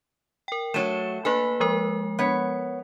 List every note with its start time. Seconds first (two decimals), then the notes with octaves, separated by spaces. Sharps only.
0.48 A#4 G5
0.74 F#3 A3 C#5 E7
1.25 A#3 A4 B4 G#5
1.60 F3 G#3 A#4
2.19 B3 C#5